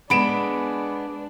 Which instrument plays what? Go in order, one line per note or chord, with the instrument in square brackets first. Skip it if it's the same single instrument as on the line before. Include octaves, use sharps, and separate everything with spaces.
[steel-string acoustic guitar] G#3 B3 G#4 [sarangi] D4 [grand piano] B5 D7 E7